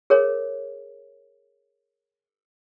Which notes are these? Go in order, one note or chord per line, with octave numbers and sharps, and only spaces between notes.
G#4 A#4 C#5